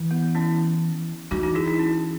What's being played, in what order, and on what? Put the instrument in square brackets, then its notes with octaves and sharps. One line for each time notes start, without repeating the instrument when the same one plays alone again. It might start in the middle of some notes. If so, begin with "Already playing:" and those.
Already playing: [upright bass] E3
[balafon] B3
C#4 E4
[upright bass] E3 [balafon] D#4 F#4
[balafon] D#4 F#4
E4 G#4
E4 G#4
C#4